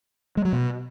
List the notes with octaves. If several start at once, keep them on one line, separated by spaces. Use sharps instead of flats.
G#3
F#3
B2